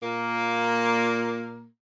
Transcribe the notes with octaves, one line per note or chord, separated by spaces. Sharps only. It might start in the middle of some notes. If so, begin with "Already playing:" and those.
A#2 A#3